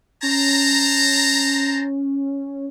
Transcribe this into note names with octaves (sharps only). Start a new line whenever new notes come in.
C#4 C5 A5 A#5